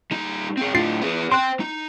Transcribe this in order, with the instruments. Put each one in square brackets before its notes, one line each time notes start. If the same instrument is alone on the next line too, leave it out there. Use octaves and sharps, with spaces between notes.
[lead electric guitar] G3 D#4
C4 G#4
[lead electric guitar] A2 D4 [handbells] F4 A6 C7
[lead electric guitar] B3 G#4
[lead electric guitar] C5 G5 [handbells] C6 F#6
[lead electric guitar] D#4